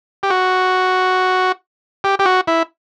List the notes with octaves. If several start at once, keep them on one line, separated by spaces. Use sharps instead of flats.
G4
F#4
G4
G4
F#4
E4